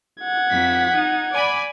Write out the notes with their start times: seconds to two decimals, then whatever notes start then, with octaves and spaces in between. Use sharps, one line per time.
0.21 F#5 G#6
0.50 F2 B6
0.94 D#4
1.33 D5 G#5 B5